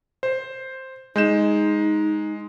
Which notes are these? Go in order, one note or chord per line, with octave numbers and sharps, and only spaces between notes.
C5
G#3 D#4 G6 E7